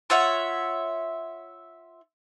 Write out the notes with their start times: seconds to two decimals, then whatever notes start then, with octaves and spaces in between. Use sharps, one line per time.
0.10 F4 C#5 E5 F#5